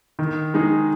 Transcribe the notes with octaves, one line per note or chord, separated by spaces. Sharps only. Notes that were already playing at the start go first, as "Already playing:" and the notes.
D#3
G#3 D#4 G#4